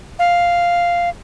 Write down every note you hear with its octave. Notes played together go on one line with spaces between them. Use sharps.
F5